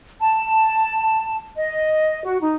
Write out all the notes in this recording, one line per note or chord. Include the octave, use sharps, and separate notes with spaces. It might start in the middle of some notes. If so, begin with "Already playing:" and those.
A5
D#5
F#4
D#4